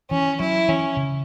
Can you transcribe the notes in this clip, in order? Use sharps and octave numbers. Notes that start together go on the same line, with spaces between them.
E3 C#4
F#3 E4
E3 C#4
C#3